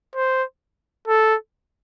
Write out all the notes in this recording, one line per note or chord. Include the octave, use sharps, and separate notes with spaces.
C5
A4